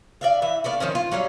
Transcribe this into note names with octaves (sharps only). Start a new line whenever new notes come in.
D5 E5 F5
E3 E5
A3 B3 D5 F5
D#3 F3 C4 C#4
F4
F#3 G3 C#4 F4